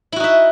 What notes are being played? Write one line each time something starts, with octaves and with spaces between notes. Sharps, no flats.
D#4 E4 F#4 E5